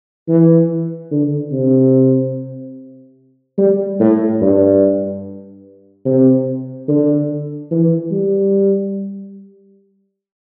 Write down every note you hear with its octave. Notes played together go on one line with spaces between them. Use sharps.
E3
D3
C3
G3
A2
G2
C3
D3
E3
G3